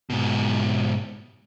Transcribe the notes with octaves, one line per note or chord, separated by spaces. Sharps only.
G#2 B2